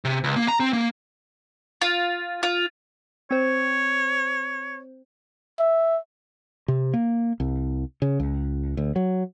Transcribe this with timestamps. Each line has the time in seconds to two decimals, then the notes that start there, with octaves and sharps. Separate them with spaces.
0.05 C3
0.24 C#2
0.36 A#3
0.48 A#5
0.60 C4
0.73 A#3
1.82 F4
2.43 F4
3.31 C4 C5 C#5
5.59 E5
6.68 C3
6.94 A#3
7.40 C2
8.02 C#3
8.20 C#2
8.77 D2
8.96 F#3